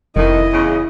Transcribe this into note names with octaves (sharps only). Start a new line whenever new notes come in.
F1 F2 D#3 E4 D#5
E2 C#3